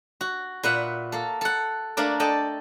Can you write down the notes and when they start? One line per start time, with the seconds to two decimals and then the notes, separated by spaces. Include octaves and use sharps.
0.21 F#4
0.63 A#2 B4 E5 F#5
1.12 A#3 A4
1.41 A4 F#5
1.97 A3 A#3 D4 A#4 D5
2.20 A4 D5 D#5 G5 A5